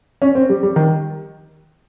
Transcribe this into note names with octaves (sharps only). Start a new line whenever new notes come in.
C#4
C4
G3
G3
D#3